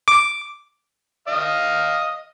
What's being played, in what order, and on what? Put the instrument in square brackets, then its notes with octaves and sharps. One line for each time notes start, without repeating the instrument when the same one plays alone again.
[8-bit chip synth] D6
[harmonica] D#5 F5 D#6